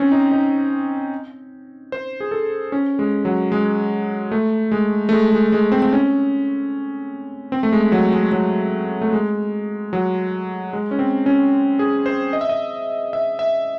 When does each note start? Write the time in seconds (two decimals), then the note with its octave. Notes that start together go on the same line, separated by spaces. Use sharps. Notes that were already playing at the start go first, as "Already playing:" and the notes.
Already playing: C4 C#4
0.12 D#4
0.32 D#4
1.92 C5
2.20 G#4
2.31 A4
2.72 C#4
2.99 G#3
3.25 F#3
3.52 G#3
4.32 A3
4.72 G#3
5.09 A3
5.12 G#3
5.32 G#3
5.52 G#3
5.72 C4
5.82 C4
5.93 C#4
7.52 C4
7.63 A3
7.72 G#3
7.92 F#3
8.13 G#3
8.32 F#3
9.01 A3
9.13 G#3
9.93 F#3
10.73 G#3
10.91 C#4
10.99 C4
11.26 C#4
11.79 G#4
12.06 C5
12.33 D#5
12.41 E5
12.49 D#5
13.13 E5
13.39 E5